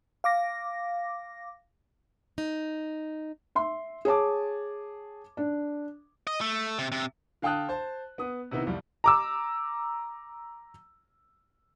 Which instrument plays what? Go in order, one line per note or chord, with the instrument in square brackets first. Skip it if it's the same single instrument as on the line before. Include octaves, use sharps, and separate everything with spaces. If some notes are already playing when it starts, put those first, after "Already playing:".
[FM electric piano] F5 D6 A#6
[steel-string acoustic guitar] D#4
[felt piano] E5 C6
G#4 C#5 A5 D6
D4
[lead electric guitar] D#5
A3
C3
C3
[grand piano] D3 F5 G5 A5 D#6 F#6
C5 A5
B3 D#6
C3 D#3 B3 D#4 E4
C2 F2 G3
A#5 D6 E6